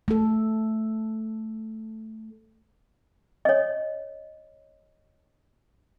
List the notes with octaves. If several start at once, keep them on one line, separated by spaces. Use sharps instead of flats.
A3 A4
C#5 D#5